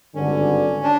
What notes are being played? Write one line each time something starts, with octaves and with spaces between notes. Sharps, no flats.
G#1 G2 D3 C#4
D4